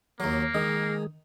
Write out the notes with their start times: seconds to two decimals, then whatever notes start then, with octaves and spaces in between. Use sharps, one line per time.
0.20 D#2 F#3 A#3
0.55 D#3 G#3 G#4